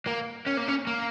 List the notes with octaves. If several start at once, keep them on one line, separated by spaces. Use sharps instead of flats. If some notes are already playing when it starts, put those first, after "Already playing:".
A#3
C#4
A#3
C#4
A#3